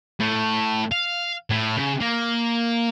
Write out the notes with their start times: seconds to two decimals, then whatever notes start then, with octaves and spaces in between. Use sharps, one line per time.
0.20 A2
0.91 F5
1.50 A2
1.77 C#3
2.01 A#3